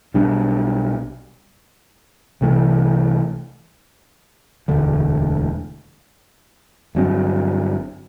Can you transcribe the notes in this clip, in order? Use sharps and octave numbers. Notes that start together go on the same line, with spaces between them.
B1 B2 G3 D4
C2 C3 E3 A3
E1 D2 D3 A3
G1 G2 F#3 C4